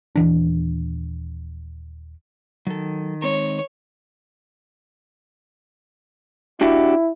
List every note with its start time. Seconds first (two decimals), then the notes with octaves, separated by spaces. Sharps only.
0.15 D#1 E3 D4
2.67 D#3 F#3 A4
3.22 G#3 C4 A#4 C#5
6.61 D4 E4 F#4 G4